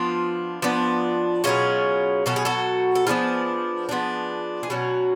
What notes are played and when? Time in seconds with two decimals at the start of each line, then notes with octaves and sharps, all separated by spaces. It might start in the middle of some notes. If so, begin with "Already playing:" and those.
Already playing: F3 B3 D4 F4
0.62 F3 B3 D4
1.44 B2 F#3 C#4 F4 G#4
2.26 B2 F#3 C#4 A4
2.36 G#4
2.45 F#4 A4
2.95 A4
3.07 F3 B3 D4 F4 G#4
3.89 F3 B3 D4
4.63 G#4
4.70 B2 F#3 C#4 F#4